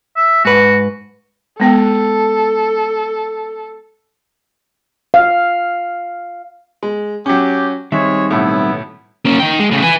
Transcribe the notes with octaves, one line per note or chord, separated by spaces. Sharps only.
E5
G#2 F#4 B4
G#3 B3 A4 G5
F5
G#3
F#3 C#4 G4
D#3 G3 G#3 C4 C#5 E5
B1 A2 B3 E4
A#3 C#4
D#3 G5
G#3
A2 C#3
B4 G#5